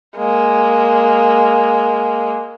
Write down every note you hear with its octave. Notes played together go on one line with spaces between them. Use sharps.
G#3 A#3